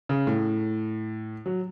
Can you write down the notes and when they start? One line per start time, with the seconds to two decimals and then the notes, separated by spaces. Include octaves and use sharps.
0.09 C#3
0.27 A2
1.46 F#3